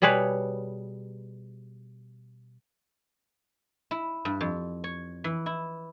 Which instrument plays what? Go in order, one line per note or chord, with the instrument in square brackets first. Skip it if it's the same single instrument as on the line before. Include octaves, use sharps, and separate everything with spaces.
[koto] B2 G3 G#4 B4 C#5
[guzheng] E4
G2
F2
C#5
E3
E4